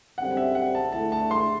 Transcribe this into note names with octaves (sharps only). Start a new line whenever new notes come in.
F#2 D3 G3 C4 F#5
E5
F#5
A5
D3 A3 E4 A5
A5
C6